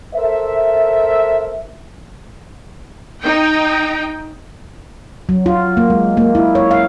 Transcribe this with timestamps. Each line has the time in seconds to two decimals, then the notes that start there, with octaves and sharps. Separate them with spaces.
0.15 A4 A#4 C5 E5
3.21 D#4 G5
5.29 F#3
5.46 F4
5.77 A#3
5.90 G#3
6.17 A#3
6.35 E4
6.55 C#5
6.71 F5